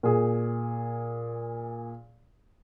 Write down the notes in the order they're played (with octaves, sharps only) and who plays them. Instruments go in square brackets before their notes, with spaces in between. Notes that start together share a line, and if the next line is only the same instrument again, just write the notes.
[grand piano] A#2 G#4